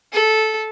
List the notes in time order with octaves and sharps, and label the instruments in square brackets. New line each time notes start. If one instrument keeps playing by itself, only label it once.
[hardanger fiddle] A4